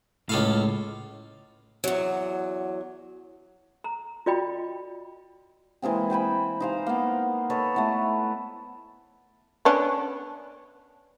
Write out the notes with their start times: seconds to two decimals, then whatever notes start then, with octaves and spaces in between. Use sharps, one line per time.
0.29 C#2 A2 A4 F5
1.84 E2 F#3
3.84 A#5
4.26 F4 F#4 D5 D#5 G5 B5
5.82 E3 G#3 A#3 C4
6.10 C5 G5 G#5 B5
6.60 D#4 C5 F5
6.86 A#3 B3
7.50 A4 B4 C#5 D#5
7.74 A3 B3 E4
9.65 B3 C#4 D4